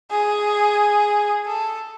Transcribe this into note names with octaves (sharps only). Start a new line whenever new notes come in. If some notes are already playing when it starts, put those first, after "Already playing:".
G#4
A4